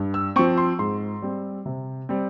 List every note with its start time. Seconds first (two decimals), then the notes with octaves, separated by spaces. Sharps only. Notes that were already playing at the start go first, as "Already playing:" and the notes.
Already playing: G2
0.14 E6
0.36 C4 C#6
0.39 F3
0.58 C6
0.79 G#2 C6
1.22 G3 C4
1.66 C3
2.09 G3 C4